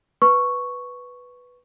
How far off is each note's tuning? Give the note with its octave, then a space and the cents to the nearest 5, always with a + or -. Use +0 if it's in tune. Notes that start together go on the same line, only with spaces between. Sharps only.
B4 +0 C#6 +0